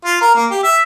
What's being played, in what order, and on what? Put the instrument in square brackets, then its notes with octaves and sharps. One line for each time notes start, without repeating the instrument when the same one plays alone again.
[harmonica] F4
A#4
A#3
G4
E5